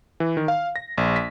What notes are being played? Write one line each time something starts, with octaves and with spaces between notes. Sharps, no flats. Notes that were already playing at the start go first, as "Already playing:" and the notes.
E3
D#3
F5
A#6
A#1
B6